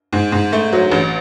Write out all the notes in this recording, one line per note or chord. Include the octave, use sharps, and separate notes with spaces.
G#2
G#2
A3
F#3
A1